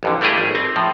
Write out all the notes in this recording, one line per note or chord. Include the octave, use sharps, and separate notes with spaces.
A1 F2 D3
G3 A3 E4 G4 G#4 D#5
G#1
C4
A2 F3